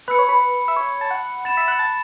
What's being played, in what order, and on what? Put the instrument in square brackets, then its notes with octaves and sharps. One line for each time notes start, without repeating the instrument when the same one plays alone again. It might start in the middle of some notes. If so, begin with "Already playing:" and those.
[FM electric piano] B4 [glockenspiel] B5 E6 C#7
[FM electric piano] C#5
B4
E5
C#5
A5
F#5
[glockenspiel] B5 A6 E7
[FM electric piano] E5
F#5
A5